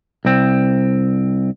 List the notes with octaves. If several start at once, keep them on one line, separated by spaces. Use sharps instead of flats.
C2 C4